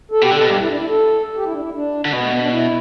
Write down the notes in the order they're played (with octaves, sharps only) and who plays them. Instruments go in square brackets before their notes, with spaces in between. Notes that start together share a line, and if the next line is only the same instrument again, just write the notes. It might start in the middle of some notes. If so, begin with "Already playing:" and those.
[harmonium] A4
[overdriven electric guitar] B2 [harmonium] G4
[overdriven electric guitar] D3
[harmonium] A4
[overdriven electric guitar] B2
[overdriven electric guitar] G2 [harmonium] G4
[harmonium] E4
D4
E4
A4
G4
E4
D4
E4
D4
[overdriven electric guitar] D3
[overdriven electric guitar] B2 [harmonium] B3
[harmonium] A3
B3
D4
E4